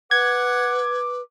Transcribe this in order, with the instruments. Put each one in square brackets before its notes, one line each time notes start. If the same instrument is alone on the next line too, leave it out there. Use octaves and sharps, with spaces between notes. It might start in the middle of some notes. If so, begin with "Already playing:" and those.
[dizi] B4 [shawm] F#5 [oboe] D6 [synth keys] G#6